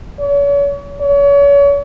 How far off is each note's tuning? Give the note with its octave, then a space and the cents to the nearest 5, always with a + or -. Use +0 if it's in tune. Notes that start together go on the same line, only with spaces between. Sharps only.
C#5 +40
C#5 +35